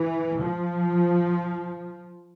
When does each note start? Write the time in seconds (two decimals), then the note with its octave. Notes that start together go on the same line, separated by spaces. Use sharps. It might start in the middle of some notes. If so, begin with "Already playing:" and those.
Already playing: E3
0.41 F3